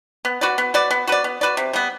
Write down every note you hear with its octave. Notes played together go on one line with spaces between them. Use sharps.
B3
F#4 B4 D5
B3
F#4 B4 D5
B3
F#4 B4 D5
B3
F#4 B4 D5
C3
G3 B3